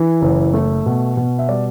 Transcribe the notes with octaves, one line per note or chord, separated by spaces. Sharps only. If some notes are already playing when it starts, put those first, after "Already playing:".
Already playing: E3
F#1
A3
B2
B2
E5
G3 D5